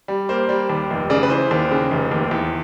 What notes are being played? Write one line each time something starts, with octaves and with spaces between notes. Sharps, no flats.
G3
A#3 C5
G3
D#2
F1
C#3 D5
B4
E3 C5
D#2
C#3
F1
D#2
E2